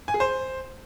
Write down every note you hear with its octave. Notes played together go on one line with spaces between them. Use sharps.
G#5
G#4
C5